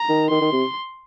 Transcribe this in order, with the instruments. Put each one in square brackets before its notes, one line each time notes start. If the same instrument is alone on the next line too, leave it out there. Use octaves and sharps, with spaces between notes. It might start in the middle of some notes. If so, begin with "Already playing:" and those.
Already playing: [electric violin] A#5
[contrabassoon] D#3
[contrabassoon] D#3 [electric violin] C6
[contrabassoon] D#3
C3